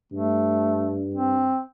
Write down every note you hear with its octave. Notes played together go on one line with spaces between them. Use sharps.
G2 A3
C4